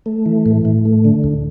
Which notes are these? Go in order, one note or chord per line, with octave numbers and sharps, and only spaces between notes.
A3
E3
A2
A2
A3
D3
D2